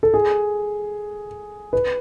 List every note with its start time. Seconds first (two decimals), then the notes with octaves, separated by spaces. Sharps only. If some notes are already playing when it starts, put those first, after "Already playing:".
0.03 A4
0.14 G#4
1.73 B4